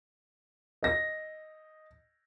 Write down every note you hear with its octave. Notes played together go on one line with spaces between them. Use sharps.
D#5 A#6